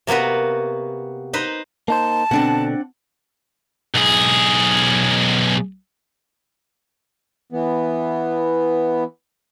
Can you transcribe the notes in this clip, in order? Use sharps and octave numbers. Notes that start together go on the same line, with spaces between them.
C3 A#3 B3 F#4 B4
D#4 B4 C5
A#3 D#4 C5 A5
B2 D3 C4 D4 F#5
B1 G#4
E3 B3